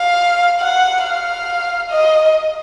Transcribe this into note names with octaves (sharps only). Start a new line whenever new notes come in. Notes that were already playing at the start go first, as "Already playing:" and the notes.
Already playing: F5
F#5
F5
D#5